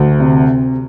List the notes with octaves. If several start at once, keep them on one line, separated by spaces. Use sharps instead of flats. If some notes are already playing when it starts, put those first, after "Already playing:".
Already playing: D2
C3